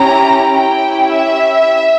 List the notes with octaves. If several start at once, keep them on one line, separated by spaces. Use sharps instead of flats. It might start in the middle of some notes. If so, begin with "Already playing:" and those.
Already playing: C#4 E4 G4 A#5
C#4 E4 G4 G5
E5